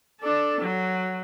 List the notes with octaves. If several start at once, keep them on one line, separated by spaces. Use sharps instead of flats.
D4 A4
F#3